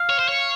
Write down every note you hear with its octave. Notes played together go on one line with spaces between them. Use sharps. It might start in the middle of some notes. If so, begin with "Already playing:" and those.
Already playing: F5
C#5
C5
C#5